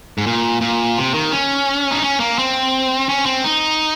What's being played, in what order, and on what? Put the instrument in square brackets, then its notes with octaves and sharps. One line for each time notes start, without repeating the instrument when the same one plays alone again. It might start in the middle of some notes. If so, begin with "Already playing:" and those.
[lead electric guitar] G#2
A#2
A#2
C3
D#3
C#4
D#4
C#4
A#3
C4
C#4
C4
D#4